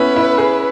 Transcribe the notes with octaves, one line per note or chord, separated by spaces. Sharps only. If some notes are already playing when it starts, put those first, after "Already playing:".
Already playing: B3 C#4 E4 B4
E4
G#4